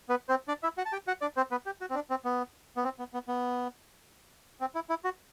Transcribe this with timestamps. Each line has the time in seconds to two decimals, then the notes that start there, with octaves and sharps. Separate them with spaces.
0.09 B3 B4
0.29 C4 C5
0.48 D4 D5
0.63 E4 E5
0.77 F#4 F#5
0.85 A5
0.92 G4 G5
1.07 F#4 F#5
1.21 D4 D5
1.37 C4 C5
1.51 B3 B4
1.66 G4
1.81 F#4
1.90 C4
1.95 D4
2.10 C4
2.25 B3
2.77 B3
2.84 C4
2.99 B3
3.14 B3
3.28 B3
4.61 C4
4.75 E4
4.89 E4
5.04 F#4